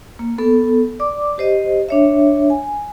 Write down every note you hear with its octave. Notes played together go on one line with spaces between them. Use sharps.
A#3
B3 A4
D5 D6
G4 C5 D#5
D4 C#5 E5
G#5